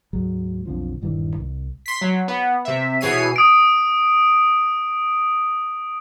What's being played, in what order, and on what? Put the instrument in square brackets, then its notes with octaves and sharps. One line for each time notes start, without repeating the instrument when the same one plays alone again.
[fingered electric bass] D2 G#2 F#3 G#3
B1 F2 D3 F3
D#1 G2 D#3 E3
C2
[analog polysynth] C6 B6
F#3
B3
C3 E5
B2 E3 G#4 C#5 C7 D#7
[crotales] D#6 D7